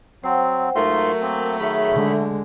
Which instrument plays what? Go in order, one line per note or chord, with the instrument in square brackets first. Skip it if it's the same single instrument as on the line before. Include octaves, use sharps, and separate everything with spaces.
[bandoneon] F#3 C4 [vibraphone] C5 F#5 G5
[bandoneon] G#2 F4 C6 [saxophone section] F#3 A3 [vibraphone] A#4
[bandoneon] A#3 C4
[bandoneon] D#3 B5 [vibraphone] G#4 C#5 E5
[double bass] D3 G#3